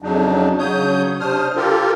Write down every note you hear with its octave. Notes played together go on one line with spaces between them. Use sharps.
F2 C#3 F#3 D4 D#4
C#3 F#3 C#5 D#6 G6
C3 D4 C5 D#6 F6
F4 G4 A4 A#4